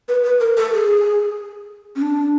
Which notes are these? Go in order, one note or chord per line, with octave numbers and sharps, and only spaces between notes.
B4
B4
A#4
A4
G#4
C#4
D4